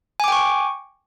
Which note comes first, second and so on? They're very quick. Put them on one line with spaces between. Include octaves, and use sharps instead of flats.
G#5 D6 G5 C#6